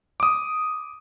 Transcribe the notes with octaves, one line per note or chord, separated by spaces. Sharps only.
D6 D#6